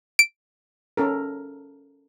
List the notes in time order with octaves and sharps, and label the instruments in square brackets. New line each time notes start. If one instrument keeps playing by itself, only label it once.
[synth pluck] D7
[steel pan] C#4 A4 A#4